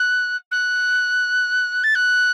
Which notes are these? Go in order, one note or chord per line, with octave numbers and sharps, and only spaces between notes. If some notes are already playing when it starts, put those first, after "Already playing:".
Already playing: F#6
F#6
A6
F#6